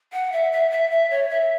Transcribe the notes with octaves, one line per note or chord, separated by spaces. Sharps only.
F#5
E5
E5
E5
E5
C#5
E5